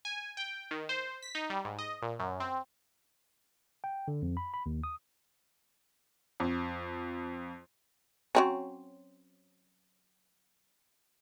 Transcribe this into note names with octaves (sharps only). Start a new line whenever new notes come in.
G#5
G5
D#3
C5
B6
D#4
G3
G#2
D#5
A#2
F#2
C4
G5
D3
F2
B5
B5
D#2
D#6
F2
F#3 C4 C#4